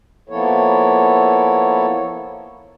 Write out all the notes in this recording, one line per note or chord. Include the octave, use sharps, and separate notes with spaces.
F3 A#3 B3 E4 A4 C#5